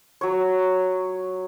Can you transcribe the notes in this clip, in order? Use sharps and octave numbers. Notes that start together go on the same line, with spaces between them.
F#3 C#5